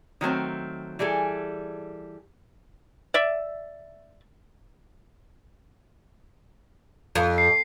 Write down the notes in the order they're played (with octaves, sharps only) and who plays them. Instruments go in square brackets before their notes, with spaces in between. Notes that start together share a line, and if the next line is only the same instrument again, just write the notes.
[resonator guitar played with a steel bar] D#3 F#3 A3 C4
E3 G3 G#4 A4
[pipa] D5 E5
[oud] F2
[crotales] C7